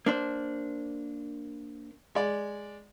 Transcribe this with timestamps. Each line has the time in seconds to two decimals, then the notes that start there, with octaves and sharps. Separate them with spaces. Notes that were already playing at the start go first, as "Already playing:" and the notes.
0.06 A#3 D4 C5
2.15 G#3 D5